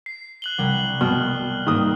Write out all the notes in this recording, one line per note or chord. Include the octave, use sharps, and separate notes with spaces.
C7
F#6 F#7 G7
C2 G3 F#5
B2 G3 F6
G#2 D#3 A#3 D#6